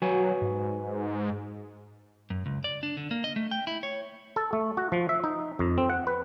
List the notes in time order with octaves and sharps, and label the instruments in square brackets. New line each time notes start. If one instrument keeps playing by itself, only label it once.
[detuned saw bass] F#3 [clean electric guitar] F#4 B4 G#5
[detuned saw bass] G#2
[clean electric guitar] F#2
C#2
D5
D4
D3
A#3
D#5
A3
G5
E4
C#5
[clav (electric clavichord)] A4
A3
F#4
F3
E5
D#4
F2
C4
F#5
B4